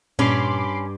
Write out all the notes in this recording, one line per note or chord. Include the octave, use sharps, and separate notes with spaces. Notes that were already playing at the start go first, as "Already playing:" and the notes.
G2 A#2 C#4 B5 C6 D6